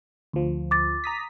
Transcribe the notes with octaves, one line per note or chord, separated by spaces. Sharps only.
D2 F3
D6 A6
A#5 D#6 B6